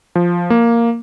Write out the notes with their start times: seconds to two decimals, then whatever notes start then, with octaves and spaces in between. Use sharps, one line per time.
0.15 F3
0.50 A#3